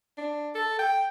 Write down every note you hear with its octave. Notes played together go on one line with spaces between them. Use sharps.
D4
A4
G5